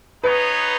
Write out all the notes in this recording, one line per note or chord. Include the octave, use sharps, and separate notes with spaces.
B3 D#4 G#4 B4 C#5